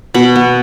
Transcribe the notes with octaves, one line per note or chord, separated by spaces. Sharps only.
B2 B5
B3